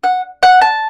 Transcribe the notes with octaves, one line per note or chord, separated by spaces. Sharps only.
F#5
F#5
A5